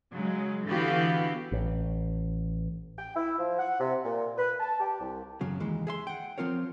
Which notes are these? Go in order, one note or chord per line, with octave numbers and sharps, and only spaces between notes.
C#3 F#3 G#3
D3 E3 B3 F#4 G4 F5
A1
G5
E4
F3
F#5
C3
A#2
B4
A5
G4
C2
F#2 C#3 F#3
D#2 E3 G#3
G#4 E5 C6
F#5 G5
F3 C4 F4 A#4 C#5